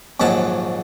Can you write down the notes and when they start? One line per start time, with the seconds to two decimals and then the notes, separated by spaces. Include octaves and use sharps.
0.20 A#1 D#2 G#2 F#3 A5